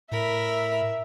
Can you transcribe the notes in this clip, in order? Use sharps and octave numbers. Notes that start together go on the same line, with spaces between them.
A2 A#4 E5 B5